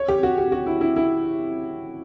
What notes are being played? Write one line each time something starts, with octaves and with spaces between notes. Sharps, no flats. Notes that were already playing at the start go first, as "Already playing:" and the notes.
Already playing: C#5
G4
F#4
G4
F#4
E4
E4
E4